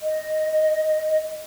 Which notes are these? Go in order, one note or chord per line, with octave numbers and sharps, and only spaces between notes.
D#5